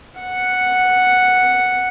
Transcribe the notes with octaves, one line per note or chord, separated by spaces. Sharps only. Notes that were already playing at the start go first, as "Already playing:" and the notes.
F#5